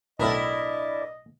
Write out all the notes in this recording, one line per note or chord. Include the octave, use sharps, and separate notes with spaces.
B1 A2 D4 E4 A#4 D5 D#5